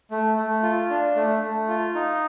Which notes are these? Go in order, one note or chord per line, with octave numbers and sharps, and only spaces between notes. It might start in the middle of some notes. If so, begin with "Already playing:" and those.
A3
A3
F4
D4
A3
A3
F4
D#4